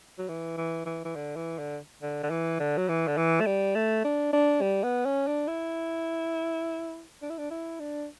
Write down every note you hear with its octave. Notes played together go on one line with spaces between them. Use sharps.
F#3
E3
E3
E3
E3
D3
E3
D3
D3
D3
E3
D3
F#3
E3
D3
E3
A3
G3
A3
D4
D4
G3
B3
C#4
D4
E4
D4
E4
D4
E4
D4